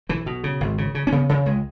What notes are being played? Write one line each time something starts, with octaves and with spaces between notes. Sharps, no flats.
B1 E3
B2
C#3
G#1
C#3
C#3
C#4
C#3 B3
C#3
C#2 G#3